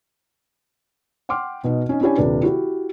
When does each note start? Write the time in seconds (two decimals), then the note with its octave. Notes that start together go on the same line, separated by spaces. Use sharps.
1.29 F#5 G5 C6 D6 F6
1.64 B2 D#4
1.89 C#4 D#4
2.01 C#4 D4 E4 G4 C#5 G#5
2.17 D#1 C3 D4 B4
2.42 E4 F#4 G4